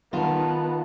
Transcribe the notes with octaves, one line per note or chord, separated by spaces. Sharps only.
D#3 B3 F4 A5